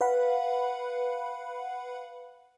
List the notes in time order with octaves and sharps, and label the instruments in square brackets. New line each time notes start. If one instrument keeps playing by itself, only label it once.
[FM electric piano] B4 F5 F#5 B5